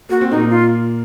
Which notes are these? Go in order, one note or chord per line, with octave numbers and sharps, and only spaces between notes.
A#3 F#4
C4
A#2 A#3 D#4
F4